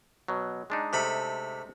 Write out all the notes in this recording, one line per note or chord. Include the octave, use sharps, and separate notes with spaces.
B2 F#3
G#3 D4 D#4
C3 A3 B5